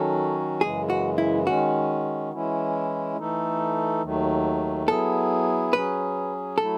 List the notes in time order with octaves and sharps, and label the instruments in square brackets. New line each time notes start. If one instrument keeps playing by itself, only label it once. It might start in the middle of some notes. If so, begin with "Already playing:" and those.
Already playing: [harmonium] D#3 F#3 C#4 F#4 [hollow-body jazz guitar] A4
[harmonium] F#2 C#3 E3 G#3 [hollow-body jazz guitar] G#4
[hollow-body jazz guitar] F#4
E4
[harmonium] D#3 G#3 C#4 [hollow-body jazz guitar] F#4
[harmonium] E3 G#3 C#4 E4
E3 A3 D#4 A4
D#2 D#3 F#3 A3
[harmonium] F#3 B3 E4 G#4 [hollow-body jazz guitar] A4
[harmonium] F#3 C#4 G#4 [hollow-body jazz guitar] B4
[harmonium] F#3 A3 E4 [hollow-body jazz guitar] A4